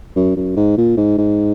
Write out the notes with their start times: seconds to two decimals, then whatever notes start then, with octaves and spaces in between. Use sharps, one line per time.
0.16 F#2
0.36 F#2
0.56 G#2
0.77 A#2
0.97 G#2
1.18 G#2